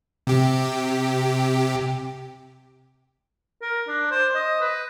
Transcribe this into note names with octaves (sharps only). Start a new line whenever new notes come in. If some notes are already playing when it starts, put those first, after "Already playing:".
C3 G4
A#4
D4
C5
D#5
B4